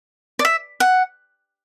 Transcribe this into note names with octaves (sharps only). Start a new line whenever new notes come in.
D5
E5
F#5